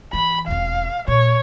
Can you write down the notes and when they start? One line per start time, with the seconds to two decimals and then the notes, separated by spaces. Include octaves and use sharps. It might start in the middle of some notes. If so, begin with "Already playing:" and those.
0.13 E3 B5
0.47 E1 F2 F5
1.08 A#2 C#5